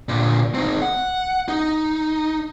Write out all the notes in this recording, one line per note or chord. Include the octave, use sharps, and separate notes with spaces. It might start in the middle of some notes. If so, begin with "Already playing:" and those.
A#2 D3
C4 D#4
F#5
D#4